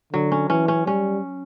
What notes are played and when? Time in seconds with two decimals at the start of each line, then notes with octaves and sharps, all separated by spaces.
0.13 D3 F#3
0.32 C#4
0.50 E3 C#4
0.68 C#4
0.86 G3 C#4